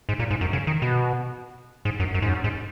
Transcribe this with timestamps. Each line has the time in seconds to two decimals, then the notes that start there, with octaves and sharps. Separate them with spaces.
0.09 G#2
0.19 A#2
0.31 G#2
0.41 F#2
0.53 C#3
0.67 D#3
0.82 B2
1.85 G#2
2.00 F#2
2.14 F#2
2.22 G#2
2.29 F#2
2.44 G#2